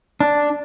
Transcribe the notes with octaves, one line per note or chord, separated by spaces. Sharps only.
D4